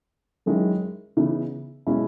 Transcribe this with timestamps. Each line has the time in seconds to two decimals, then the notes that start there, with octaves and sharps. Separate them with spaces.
0.46 F#2 D#3 G#3 C#4 E4
1.17 C#3 E3 B3 D#4
1.87 B2 G#3 C#4 E4